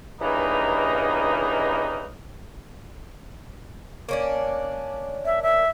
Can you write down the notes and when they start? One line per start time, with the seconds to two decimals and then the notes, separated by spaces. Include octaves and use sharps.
0.21 G2 C#3 E3 A#3 B3 D#4
4.09 A#3 C#4 D4
5.25 E5
5.43 E5